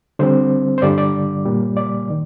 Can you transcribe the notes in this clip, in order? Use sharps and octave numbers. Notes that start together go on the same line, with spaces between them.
D3 G3 C4 C5
C5
G2 D3 G3 D5
D5
A#2 G3 A#3
D5
D#3